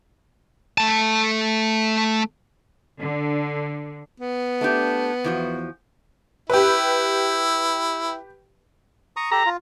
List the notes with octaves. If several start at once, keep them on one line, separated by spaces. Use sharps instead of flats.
A3 A5
D3
B3
A3 D4 G4
E2 F3 F#4
E4 G4 B4
A#5 C#6 D#6
G4 A4 A5 A#5
F4